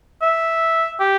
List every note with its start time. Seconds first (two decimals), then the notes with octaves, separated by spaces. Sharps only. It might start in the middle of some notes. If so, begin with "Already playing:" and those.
0.22 E5
1.00 G4